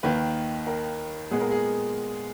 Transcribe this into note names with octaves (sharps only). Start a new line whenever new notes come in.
D#2 D#3 A#3 B4
A#4
A#2 G#3 B3 G#4
A#4
G#4